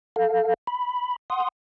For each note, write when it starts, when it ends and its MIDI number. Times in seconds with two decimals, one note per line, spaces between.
0.16 0.54 69
0.16 0.54 77
0.67 1.16 83
1.30 1.48 78
1.30 1.48 84
1.30 1.48 87